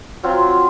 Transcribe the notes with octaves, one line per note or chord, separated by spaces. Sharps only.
F#3 C4 F4